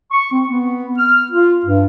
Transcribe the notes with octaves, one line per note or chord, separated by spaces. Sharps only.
C#6
C4
B3
F6
F4
G2